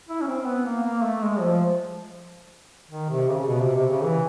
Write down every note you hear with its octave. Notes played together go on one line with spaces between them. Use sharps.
E4
C#4
C4
B3
A#3
A#3
A3
G#3
F3
D#3
C3
C#3
B2
C3
C3
C#3
E3